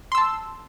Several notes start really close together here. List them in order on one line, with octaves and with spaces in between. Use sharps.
C6 E6 A5